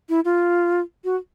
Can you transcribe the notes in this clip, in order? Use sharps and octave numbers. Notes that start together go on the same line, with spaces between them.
E4
F4
F#4